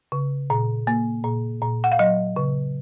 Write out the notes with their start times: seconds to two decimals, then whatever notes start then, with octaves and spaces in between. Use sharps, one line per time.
0.12 C#3
0.50 A#2
0.87 A#3
1.24 A#2
1.62 A#2
1.84 F#5
1.92 F5
1.99 F#3 D#5
2.36 C#3